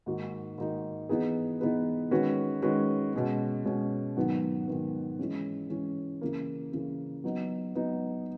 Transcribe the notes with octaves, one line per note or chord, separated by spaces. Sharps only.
G#2 D#3 A#3 D#4 F#4
G#2 D#3 A#3 D#4 F#4
E3 B3 D#4 G#4 B4
E3 B3 D#4 G#4 B4
D#3 G#3 C#4 F#4 B4
D#3 G#3 C#4 F#4 B4
B2 G#3 C#4
B2 G#3 C#4
G#2 D#3 F#3 B3
G#2 D#3 F#3 B3
E3 G#3 C#4
E3 G#3 C#4
C#3 E3 A#3
C#3 E3 A#3
F#3 B3 D#4
F#3 B3 D#4